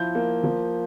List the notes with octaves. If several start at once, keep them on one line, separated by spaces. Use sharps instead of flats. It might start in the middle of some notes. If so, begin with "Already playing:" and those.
Already playing: F3 E4 G6
A#3
F3